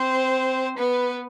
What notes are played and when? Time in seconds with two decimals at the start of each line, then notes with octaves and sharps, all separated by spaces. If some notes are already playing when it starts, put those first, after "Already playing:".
Already playing: C4 C5
0.78 B3 B4